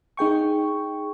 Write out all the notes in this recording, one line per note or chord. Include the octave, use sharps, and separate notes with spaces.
D#4 G#4 G5 C#6